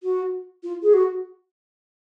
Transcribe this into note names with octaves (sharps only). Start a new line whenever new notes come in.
F#4
F4
G#4
F#4